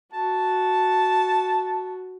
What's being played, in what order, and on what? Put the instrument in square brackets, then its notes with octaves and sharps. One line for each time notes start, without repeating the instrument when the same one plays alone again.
[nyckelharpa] F#4 [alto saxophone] A5